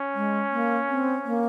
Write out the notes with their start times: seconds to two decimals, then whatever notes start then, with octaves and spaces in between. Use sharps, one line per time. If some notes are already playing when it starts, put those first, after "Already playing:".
Already playing: C#4
0.15 G#3
0.51 A#3
0.88 C4
1.25 A#3